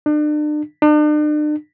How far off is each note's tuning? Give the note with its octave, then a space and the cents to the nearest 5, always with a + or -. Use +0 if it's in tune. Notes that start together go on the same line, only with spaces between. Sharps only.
D4 +40
D4 +45